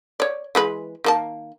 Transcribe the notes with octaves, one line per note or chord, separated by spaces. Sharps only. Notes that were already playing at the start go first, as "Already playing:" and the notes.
C#5 D5
E3 G#3 B4
D#3 A#3 A5